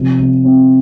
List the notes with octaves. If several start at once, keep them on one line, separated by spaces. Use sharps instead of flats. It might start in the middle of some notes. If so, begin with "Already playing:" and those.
Already playing: C3 F3
C3
C4